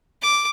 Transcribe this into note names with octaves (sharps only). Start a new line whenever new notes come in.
D6